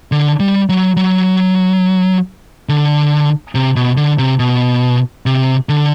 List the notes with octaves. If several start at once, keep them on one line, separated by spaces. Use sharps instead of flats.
D3
G3
F#3
F#3
D3
C3
B2
D3
C3
B2
C3
D3